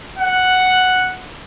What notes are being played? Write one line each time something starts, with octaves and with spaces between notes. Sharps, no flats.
F#5